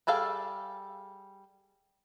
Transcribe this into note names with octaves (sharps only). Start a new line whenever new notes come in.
G3 G#4 A4 F5 G5